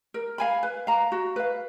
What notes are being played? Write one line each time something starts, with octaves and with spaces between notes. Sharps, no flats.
A#4
F5 G#5 B5
B4
F5 A#5
F#4
B4 F5